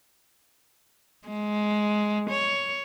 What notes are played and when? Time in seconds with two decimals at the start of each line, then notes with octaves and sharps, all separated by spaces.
1.27 G#3
2.30 C#5